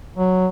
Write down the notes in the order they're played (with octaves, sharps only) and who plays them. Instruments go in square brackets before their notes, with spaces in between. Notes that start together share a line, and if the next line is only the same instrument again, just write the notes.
[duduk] F#3